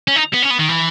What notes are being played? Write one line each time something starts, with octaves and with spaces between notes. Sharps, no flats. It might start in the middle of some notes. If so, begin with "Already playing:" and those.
C#4
D#4
B3
C#4
B3
D#3
E3